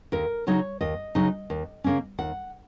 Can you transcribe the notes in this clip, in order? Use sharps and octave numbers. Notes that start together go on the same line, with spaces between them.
D#2 A#4
C#3 F#3 D#4 C#5
D#2 D#5
C#3 F#3 D#4
D#2
C#3 A#3 C#4
D#2 F#5